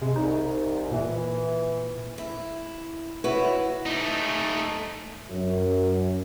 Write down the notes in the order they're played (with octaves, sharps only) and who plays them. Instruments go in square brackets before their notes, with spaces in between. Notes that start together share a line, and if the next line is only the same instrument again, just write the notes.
[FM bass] C3 [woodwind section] G#3
[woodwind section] C2 [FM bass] D#4
[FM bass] A#2 [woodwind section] E3
[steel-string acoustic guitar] E4
E4 F#4 B4 C#5
[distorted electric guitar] A3 D#4
[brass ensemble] F#2